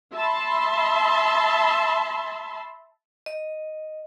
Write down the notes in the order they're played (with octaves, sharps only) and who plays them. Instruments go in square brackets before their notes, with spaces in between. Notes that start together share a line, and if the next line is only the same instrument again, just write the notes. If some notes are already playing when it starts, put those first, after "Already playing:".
[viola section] E5 A5 B5 C6
[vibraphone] D#5